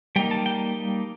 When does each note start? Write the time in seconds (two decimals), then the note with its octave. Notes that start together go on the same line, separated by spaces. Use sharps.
0.16 G3 A#3 D#4 G5
0.31 A5
0.46 G5